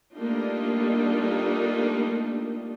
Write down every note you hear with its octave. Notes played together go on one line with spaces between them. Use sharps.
G3 A3 A#3 D4 D#4 F4